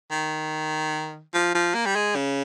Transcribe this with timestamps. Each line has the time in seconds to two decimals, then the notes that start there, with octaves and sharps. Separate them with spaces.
0.11 D#3
1.34 F3
1.55 F3
1.74 A#3
1.86 G3
1.96 G#3
2.15 C#3